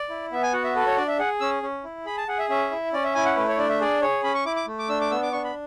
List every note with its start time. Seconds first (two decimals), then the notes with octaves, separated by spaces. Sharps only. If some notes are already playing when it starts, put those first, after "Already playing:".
Already playing: D5
0.10 E4
0.32 B3 E5
0.43 G#5
0.53 F#4 F#5
0.64 E5
0.75 A4 B4
0.87 C#5
0.97 D4 D5
1.08 E5
1.19 G#4 F#5
1.40 C#4 E6
1.63 C#4
1.84 E4
2.06 G#4 B5
2.17 A5
2.28 G#4 F#5
2.39 E5
2.50 C#4 E5
2.71 E4
2.93 C#4 D5
3.04 E5
3.14 E4 G#5
3.25 F#5
3.36 A3 B4
3.48 C#5
3.58 D4 D5
3.69 E5
3.81 G#4 D5
4.02 G#4 C#5
4.23 C#4 B5
4.35 C#6
4.45 E4 D6
4.56 D6
4.67 A3
4.79 D6
4.89 D4 E6
5.01 D6
5.11 B3 E6
5.22 D6
5.32 D4 C#6
5.44 B5